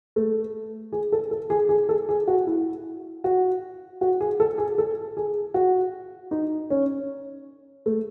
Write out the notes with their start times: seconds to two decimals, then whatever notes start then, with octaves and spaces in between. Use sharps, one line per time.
0.16 A3
0.92 G#4
1.12 A4
1.31 A4
1.50 G#4
1.69 G#4
1.89 A4
2.09 G#4
2.28 F#4
2.47 E4
3.24 F#4
4.01 F#4
4.21 G#4
4.40 A4
4.58 G#4
4.78 A4
5.17 G#4
5.54 F#4
6.31 D#4
6.70 C#4
7.86 A3